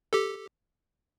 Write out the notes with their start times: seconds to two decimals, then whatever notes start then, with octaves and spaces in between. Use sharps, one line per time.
0.13 G4 A4